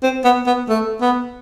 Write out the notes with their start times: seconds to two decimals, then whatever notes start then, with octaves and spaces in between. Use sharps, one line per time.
0.03 C4
0.24 B3
0.46 B3
0.69 A3
1.01 B3